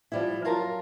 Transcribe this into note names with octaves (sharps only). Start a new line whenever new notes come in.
F3 G3 E4
F#2 F4 A#4 A5 A#5